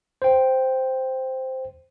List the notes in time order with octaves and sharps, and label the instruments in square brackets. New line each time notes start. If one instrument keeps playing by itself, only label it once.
[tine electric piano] C5 G5